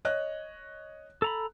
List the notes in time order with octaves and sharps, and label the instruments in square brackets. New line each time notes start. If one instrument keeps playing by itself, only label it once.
[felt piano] C#5 D#5 F#6
[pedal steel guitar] A4 A#5 B5